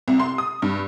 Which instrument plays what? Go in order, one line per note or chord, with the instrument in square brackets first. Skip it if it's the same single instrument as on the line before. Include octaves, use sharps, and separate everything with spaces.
[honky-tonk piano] C2
C6
D#6
G2